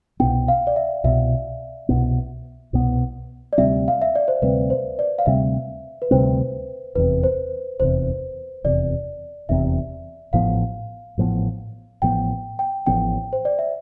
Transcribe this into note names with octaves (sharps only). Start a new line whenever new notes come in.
C2 B2 B3 G5
F5
D5
E5
C2 B2 B3 E5
C2 B2 B3
C2 B2 B3
D5
D2 C3 G3 C4 E5
F5
E5
D5
C5
D2 C3 G3 C4 B4
C5
D5
F5
D2 C3 G3 C4 E5
B4
D2 C3 G3 C4 C5
F1 E2 C3 B4
C5
F1 E2 C3 C5
F1 E2 C3 D5
F1 E2 C3 E5
A1 A2 F3 B3 F5
A1 A2 F3 B3
A1 A2 F3 B3 G5
G5
A1 A2 F3 B3 G5
C5
D5
E5